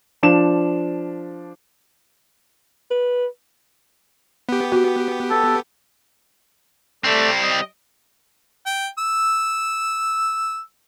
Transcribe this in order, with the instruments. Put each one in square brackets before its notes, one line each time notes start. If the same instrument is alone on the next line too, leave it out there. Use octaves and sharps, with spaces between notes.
[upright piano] F3 D4 E7
[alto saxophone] B4
[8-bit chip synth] B3 G4
[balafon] F#4
[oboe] A4
[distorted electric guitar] G3 C4 [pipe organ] A3 D5
[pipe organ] D#5
[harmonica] G5
E6